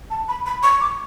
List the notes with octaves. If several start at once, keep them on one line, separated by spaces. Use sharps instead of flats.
A5
B5
B5
C#6
D6